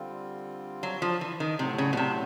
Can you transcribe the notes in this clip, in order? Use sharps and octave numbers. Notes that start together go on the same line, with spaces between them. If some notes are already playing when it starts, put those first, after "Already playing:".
Already playing: D3 G3 C4 F4
F#3
F3
E3
D#3
A2 C3 F#3 A3
C#3
B2
C3